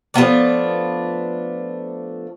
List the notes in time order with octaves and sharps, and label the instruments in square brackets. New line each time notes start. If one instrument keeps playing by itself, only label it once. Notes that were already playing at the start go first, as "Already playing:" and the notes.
[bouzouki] F3 A3 B3 D4